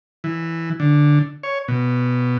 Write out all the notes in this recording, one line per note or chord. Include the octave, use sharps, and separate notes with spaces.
E3
D3
C#5
B2